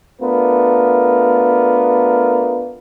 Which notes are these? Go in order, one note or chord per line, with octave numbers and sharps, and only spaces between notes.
A3 B3 D4 F4 A#4